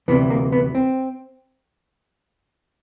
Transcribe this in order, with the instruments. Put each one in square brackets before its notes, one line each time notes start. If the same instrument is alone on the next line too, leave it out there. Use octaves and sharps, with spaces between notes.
[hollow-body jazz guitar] D2 C3 E3 B3
A#3
B3
C4